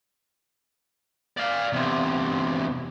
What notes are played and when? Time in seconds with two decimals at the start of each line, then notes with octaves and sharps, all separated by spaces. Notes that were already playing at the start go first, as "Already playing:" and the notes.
1.37 D5 F5
1.73 E2 C3